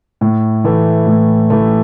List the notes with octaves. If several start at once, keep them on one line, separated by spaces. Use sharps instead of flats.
A2
E3 A3
A2
E3 A3